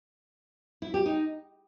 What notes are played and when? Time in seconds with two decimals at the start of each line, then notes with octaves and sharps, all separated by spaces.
0.82 E4
0.94 G4
1.06 D#4